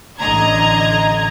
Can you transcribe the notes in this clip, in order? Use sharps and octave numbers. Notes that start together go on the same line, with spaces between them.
A1 D3 D#5 A#5 G#6